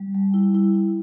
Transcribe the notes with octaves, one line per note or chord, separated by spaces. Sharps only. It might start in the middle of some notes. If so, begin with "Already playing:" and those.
Already playing: G3
G3
E4
E4
E4